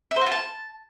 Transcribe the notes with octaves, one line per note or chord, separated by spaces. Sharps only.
E5
C5
F#4
F4
A5